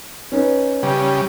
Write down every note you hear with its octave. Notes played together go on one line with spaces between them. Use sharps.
C#4 D#4 B4
C#3 G3